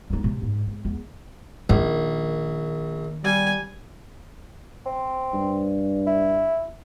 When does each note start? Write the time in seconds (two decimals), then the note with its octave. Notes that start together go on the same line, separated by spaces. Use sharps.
0.10 F#3 D#4
0.24 C3
0.42 G#2 D3
0.67 G#1
0.85 E2
1.69 A#1 D#3
3.25 G3 G#5
4.86 C4
5.34 G2
6.07 E4